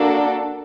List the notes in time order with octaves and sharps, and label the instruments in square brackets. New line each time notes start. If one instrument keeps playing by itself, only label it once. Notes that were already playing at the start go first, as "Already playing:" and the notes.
Already playing: [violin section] A#3 D4 F#4 A4